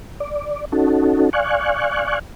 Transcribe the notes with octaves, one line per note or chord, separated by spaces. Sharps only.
D5
C#4 D#4 F#4 A4
D5 F5 G#5 C#6 F#6